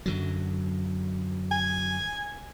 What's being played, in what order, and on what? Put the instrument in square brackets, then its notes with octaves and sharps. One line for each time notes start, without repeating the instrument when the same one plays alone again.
[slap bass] F#2 D3 F#3
[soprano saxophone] G#5